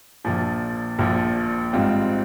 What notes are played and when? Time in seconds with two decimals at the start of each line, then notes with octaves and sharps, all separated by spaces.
0.25 A#1 A#2 F3
0.99 A#1 A#2 F3
1.73 G#1 G#2 G3 C4 F4